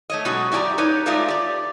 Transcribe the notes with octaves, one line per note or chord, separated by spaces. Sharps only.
A3 C#5 D#5
B2 F#3 G#3 C#4 F#4
F#2 E4 G4 D5 A5 A#5
D#4 G4 B4 C#5
G#3 A3 D#4 F4 D5 E5
G4 D5